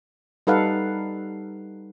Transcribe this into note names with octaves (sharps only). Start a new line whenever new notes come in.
G3 D#4 A4 B4 F5 F#5